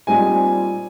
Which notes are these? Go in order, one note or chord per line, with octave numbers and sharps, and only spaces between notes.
A#2 G3 C4 D#4 G#5